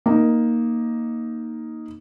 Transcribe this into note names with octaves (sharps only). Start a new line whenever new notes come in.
A#3 D#4